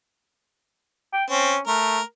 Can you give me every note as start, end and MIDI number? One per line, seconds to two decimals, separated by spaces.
1.13 1.24 79
1.30 1.54 60
1.30 1.60 61
1.68 1.99 57
1.68 2.02 70